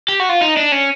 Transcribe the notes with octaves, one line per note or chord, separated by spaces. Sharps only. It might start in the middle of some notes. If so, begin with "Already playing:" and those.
G4
F#4
F4
D#4
D4
C#4